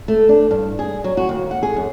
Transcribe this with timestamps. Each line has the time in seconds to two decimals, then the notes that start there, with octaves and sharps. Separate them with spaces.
0.08 A3
0.29 D4
0.51 G2
0.79 G#4
1.04 F#3
1.17 F#4
1.29 D#2
1.51 F#5
1.63 G#4
1.76 F#2